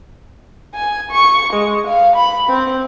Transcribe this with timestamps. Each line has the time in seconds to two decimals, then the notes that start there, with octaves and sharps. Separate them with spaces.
0.74 G#5
1.11 C#6
1.53 G#3
1.87 F5
2.16 B5
2.50 C4